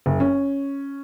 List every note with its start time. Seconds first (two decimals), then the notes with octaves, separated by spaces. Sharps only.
0.06 F#1
0.20 C#4